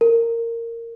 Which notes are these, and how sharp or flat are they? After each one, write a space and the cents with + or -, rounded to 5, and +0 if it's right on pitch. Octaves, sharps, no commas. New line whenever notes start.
A#4 -15